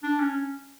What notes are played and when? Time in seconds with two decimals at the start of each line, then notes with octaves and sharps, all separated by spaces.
0.03 D4
0.20 C#4